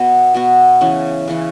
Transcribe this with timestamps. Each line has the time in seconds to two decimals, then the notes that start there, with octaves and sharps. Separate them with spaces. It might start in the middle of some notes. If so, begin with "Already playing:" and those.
Already playing: B2 B3 F#4
0.34 B2 B3 F#4
0.81 C#3 E3 C#4
1.28 C#3 E3 C#4